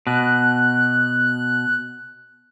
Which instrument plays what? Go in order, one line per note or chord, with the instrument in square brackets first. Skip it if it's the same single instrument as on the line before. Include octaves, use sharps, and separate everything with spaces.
[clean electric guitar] B2 [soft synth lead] F#6